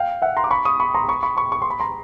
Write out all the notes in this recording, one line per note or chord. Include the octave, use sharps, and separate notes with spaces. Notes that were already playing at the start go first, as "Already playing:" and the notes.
Already playing: F5 G5
E5 F#5
A#5 C6
D6
B5 C#6
C#6 D#6
B5 C#6
A#5 C6
B5 C#6
B5 C#6
B5 C#6
C#6
C6
B5
A#5 C6